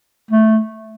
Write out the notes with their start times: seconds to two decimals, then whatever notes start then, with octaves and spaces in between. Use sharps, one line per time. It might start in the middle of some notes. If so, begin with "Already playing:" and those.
0.31 A3